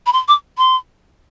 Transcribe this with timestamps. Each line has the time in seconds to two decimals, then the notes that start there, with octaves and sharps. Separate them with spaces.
0.06 B5
0.13 C6
0.28 D6
0.58 C6